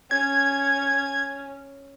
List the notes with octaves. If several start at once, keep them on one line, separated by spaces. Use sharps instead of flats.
C#4 G#6